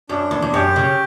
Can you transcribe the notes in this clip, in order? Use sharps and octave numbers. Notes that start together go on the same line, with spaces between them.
F#2 D4
E2
E2
F#2 G4
C#3